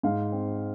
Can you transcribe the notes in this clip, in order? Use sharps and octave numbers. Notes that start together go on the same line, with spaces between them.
G#2 F5
C4